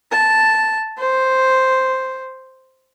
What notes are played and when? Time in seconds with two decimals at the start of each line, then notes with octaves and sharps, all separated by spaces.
0.11 A5
0.99 C5